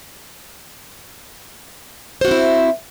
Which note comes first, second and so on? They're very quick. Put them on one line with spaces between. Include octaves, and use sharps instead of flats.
C5 F#4 C4 E4